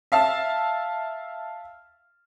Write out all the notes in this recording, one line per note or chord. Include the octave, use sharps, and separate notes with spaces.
E5 F5 A5